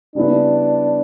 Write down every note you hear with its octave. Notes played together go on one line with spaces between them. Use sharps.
C#3 G3 B3 D4 E4